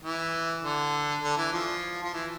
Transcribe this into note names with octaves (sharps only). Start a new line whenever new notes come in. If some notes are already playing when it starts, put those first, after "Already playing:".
E3
D3
D3
E3
F3
F3
E3